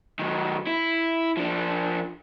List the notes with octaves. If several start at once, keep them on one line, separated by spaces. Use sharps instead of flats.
D#3 F#3
E4
F3 D4